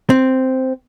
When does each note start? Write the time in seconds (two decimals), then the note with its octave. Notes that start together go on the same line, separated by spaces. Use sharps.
0.10 C4